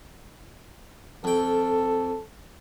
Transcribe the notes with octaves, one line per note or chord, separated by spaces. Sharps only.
F2 A4 G5